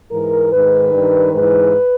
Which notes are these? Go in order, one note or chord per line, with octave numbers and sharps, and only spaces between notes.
G#2 E3 A#4
G#2 D#3 B4
G2 D#3
G#2 E3 B4